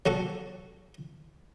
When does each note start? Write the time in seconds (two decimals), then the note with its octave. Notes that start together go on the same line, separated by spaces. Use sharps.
0.06 F#3 F#4 A4